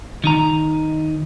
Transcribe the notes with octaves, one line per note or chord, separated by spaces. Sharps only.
D#3 D#4 A#5